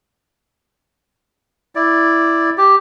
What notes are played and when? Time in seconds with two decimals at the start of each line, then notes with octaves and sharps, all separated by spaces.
1.75 E4 D5
2.58 G4